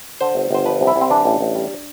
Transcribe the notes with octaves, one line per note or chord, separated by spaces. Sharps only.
D3 C5
G1
G1 C5
F3 B4
C2
E4
C2
C4
E3 D4
A1
A1
G3